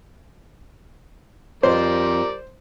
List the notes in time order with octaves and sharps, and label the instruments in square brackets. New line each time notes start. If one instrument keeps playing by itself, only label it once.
[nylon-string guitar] F2 [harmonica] G3 A#4 D5 [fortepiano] C5